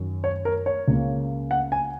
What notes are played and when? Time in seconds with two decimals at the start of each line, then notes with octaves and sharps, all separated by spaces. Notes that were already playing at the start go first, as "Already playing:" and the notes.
Already playing: F#2 D#3 F#3
0.24 C#5
0.45 A#4
0.66 C#5
0.88 C#2 C#3 A#3
1.51 F#5
1.72 G#5